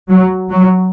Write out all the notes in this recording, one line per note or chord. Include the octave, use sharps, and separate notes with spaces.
F#3
F#3